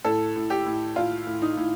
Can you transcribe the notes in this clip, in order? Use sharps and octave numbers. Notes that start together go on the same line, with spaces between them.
A2 A4
A2
G4
A2
A2 F4
A2
D#4
A2